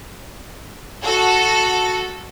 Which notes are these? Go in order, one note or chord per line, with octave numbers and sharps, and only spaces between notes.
F#4 A4